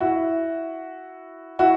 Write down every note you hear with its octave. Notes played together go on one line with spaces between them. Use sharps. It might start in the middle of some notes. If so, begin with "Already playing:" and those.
E4 F#4
E4 F#4